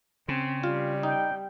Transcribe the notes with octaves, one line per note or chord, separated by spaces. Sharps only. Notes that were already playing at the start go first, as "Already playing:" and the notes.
C#3 C4
G3 F4
D#4 G5